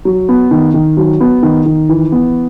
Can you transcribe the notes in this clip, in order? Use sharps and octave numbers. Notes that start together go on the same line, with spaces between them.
F#3
B3
D#3
D#3
F#3
B3
D#3
D#3
E3
B3